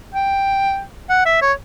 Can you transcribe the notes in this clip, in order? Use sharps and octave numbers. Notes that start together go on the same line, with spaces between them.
G5
F#5
E5
C#5